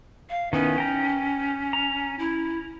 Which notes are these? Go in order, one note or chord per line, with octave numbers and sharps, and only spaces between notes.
F5
D#3 B3 C#4 E4
G5 A#5
A#5
E4